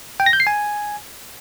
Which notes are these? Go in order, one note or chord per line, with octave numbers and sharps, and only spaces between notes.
G5
A#6
G6
C7
G#5